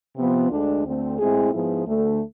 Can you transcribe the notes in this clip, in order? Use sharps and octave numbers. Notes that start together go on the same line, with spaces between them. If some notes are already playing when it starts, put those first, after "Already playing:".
C3 F3 B3 F4
D2 D3 G#3 D4
D2 D3 A3 C4
A2 G#3 C4 E4 G#4
G#2 F3 B3 E4 G#4
D2 D3 A3